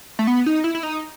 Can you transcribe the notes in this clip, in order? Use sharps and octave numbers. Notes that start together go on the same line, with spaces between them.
A3
B3
D#4
E4
E4
D#4